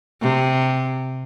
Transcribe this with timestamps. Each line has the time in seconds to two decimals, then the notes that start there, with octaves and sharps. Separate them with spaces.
0.21 C3